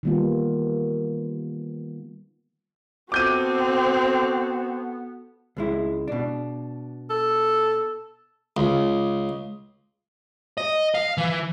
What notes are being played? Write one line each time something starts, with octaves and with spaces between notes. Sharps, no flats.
D#3 E3 G3 A#3 B3 F4
B3 C4 F#4 A4 D6 G6 D#7
C#2 G#3 E4
B2 D4
A4
C#2
D#5
F5
E3